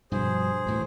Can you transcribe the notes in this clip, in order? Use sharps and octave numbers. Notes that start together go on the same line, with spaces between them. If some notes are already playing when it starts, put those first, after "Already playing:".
G2 B2 F3 G#4 C5
D2 A2 E3